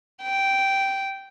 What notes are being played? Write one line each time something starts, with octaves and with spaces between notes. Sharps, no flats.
G5